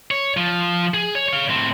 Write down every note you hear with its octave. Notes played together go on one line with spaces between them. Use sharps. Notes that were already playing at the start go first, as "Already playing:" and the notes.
C#5
F3
G#4
C#5
C#5 F5
A2 C4